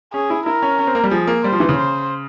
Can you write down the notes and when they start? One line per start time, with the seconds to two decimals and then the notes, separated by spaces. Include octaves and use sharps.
0.13 C#4 G#4
0.30 E4
0.46 E4 A#4
0.62 C#4
0.79 C#4
0.87 C4
0.95 A#3
1.04 G3
1.11 F3 G#4
1.27 A#3
1.44 G3 C5
1.52 F3
1.60 E3
1.69 C#3
1.77 C5